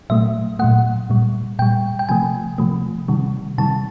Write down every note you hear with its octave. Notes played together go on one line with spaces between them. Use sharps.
A#2 F#3 A3 E5
A#2 F#3 A3 F#5
A#2 G3
A#2 G3 G5
G5
C3 F3 A3 G#5
C3 F3 A3
C3 D#3 G3
C3 D#3 G3 A5